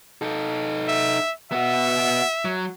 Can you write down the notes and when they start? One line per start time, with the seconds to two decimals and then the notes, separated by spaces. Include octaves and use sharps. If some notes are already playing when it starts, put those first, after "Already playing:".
0.22 D#4 A4
0.88 E5
1.52 B3 F#4 E5
2.45 F#3